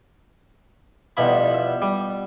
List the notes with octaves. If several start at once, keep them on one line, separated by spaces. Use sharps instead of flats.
B2 F3 G3 B3 E4 B5
E5
G3